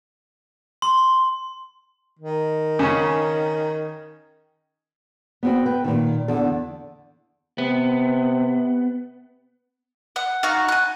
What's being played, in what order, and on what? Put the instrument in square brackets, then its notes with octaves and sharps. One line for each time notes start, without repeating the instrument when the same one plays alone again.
[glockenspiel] C6
[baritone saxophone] D#3
[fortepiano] C#3 C#4
[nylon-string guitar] B3 C4 F#4
B4 G5
A#2 D#3
E2 D3
[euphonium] C3 [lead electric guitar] B3
[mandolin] F#5
D#4 F#4 F5 C#6
G#5 F#6